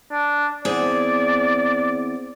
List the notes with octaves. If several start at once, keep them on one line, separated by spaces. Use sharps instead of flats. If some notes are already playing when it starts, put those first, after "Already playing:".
D4
E2 C4 G#4 D5